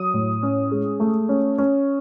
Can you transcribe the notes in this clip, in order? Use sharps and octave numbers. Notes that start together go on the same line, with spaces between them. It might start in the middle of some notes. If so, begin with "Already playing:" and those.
Already playing: F#3 D#6
A2
C#4
G#3
A3
C#4
C#4